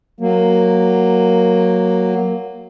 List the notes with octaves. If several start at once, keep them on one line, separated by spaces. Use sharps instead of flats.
F#3 A#3